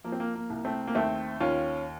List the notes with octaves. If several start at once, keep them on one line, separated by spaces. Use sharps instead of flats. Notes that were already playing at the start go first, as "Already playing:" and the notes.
F3 A#3
C4
A#3
A#3
C2
A3 C4
A#3
D#2 A3 C4
D#2 C#4 F4